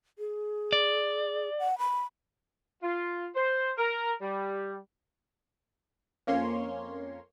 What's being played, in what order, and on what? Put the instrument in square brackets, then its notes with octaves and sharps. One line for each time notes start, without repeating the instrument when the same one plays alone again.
[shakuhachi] G#4
[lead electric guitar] D5
[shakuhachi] F#5
B5
[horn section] F4
C5
A#4
G3
[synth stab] F2 A#3 C#4 C#5 C6